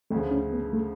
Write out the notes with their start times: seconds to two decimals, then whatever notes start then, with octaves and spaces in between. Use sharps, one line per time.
0.11 D2 C#3 F3 A3
0.31 C#4
0.53 B3
0.73 A3